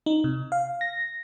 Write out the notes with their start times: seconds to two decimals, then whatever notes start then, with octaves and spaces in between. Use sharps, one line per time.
0.06 D#4
0.24 C3
0.52 F5
0.81 A#6